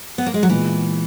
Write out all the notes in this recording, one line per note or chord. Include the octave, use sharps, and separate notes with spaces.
B3
A#3
G#3
F#3
A#2 E3 G#3 B3